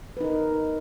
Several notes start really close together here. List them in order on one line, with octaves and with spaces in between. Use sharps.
B4 D#4 A#4